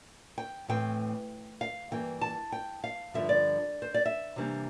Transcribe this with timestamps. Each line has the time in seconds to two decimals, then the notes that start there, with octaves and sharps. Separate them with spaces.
0.38 G5
0.68 A2 E3 A3 C4 G5
1.61 F5
1.91 G2 E3 A#3 G5
2.21 A5
2.52 G5
2.84 F5
3.14 G2 D3 F3 E5
3.29 D5
3.82 C5
3.94 D5
4.05 E5
4.36 C3 E3 G3 A#3 D4